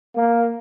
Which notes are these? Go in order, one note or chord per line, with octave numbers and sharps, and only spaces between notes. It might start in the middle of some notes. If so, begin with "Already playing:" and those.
A#3